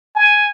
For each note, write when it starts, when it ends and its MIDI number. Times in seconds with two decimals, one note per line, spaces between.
0.16 0.46 80